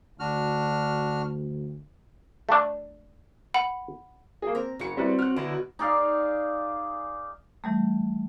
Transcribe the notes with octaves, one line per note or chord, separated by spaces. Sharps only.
D2 D4 F#4 F6
A3 D4
F#5 B5
A#3 G#4
C4 A#4
F#1 F#3 C#5 C#7
G3 C4 E4 B4
F#4 F6 F#6
B2 D3 E4 A#5
D#4 G#4 D5 F5
E3 G3 A3